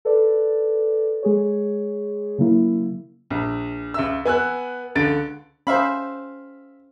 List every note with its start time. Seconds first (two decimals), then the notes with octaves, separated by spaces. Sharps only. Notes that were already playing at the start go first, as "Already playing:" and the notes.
0.05 A4 B4 D5
1.23 G#3 G#4 C#5
2.38 C#3 F#3 A#3 E4
3.30 A#1
3.94 C#2 E5 E6
4.25 B3 G#5 E6 F#6
4.95 C#2 D3 A6 D7
5.67 C#4 C5 E5 F5 B5